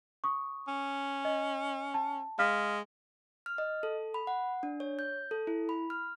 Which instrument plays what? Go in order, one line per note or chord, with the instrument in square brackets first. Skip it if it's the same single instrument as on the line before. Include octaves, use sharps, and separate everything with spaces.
[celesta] C#6 D#6
[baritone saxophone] C#4
[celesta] D#5
A5
[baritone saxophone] G#3 [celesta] F5 F6 B6
[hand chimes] F6
D#5
A4
B5
F#5
D4
C#5
G6
A4
E4
B5
F6